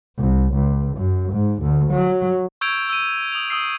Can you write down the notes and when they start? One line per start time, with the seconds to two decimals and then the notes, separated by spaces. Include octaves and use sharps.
0.18 C2
0.54 C#2
0.97 F#2
1.33 G#2
1.62 D2
1.91 F#3
2.61 C#6 E6 G6 G#6 D7 F7
2.89 E6 D#7
3.32 D#6 F7
3.50 D#6 E6 C7